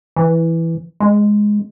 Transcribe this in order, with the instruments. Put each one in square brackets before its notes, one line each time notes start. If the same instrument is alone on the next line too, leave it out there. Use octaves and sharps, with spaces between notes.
[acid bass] E3
G#3